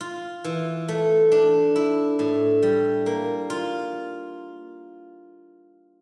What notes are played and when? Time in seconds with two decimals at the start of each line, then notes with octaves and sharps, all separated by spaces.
0.01 F4
0.44 E3
0.89 A3
1.32 D4
1.76 E4
2.19 A2
2.63 G3
3.06 A#3
3.50 F4